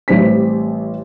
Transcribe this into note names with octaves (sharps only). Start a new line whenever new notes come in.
A1 G3 C4 B6